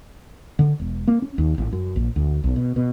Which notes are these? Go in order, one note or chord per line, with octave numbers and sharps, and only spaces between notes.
D3
E1
A#3
C#4
D#2
A1
F#2
A#1
D2
B1
B2
B2